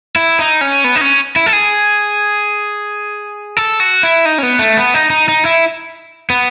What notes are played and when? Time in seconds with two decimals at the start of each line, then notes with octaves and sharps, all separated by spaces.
0.16 E4
0.39 D#4
0.61 C#4
0.84 B3
0.96 D#4
1.01 C#4
1.36 E4
1.46 A4
1.53 G#4
3.57 A4
3.80 F#4
4.03 E4
4.25 D#4
4.38 C#4
4.43 B3
4.59 A3
4.77 B3
4.94 D#4
5.10 D#4
5.28 D#4
5.45 E4
6.30 B3